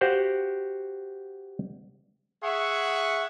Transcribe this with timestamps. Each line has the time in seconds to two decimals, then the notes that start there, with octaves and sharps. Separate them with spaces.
0.01 F#4 G4 C5 F5 F#5
2.44 G#4 E5 F#5 C#6